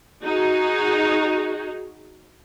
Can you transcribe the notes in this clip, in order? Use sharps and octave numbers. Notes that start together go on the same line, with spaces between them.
D#4 F#4 G#4